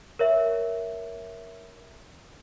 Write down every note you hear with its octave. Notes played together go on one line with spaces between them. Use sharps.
A#4 C#5 E5